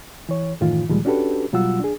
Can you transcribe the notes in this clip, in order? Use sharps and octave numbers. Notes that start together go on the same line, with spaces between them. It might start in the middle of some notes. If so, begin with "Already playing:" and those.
E3 C#5
F#2 A2 D#3 E3 F4
D2 A#2 D#3 F3 G3 G#3
C#4 D4 F#4 G4 A4 B4
B2 F#3 G3 F4 F#5 E6
D4 G#4